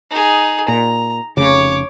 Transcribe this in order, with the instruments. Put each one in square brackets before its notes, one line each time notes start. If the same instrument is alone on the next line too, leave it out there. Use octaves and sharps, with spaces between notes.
[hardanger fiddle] D#4 G#4
[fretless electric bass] A#2 [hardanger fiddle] A#5
[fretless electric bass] F1 C#3 [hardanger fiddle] C#5 D6